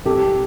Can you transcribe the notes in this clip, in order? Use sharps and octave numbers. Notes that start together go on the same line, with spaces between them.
C2 G4 A4